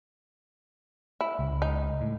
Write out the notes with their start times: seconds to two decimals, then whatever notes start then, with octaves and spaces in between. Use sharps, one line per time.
1.21 E4
1.39 C#2
1.62 D#4
2.01 A2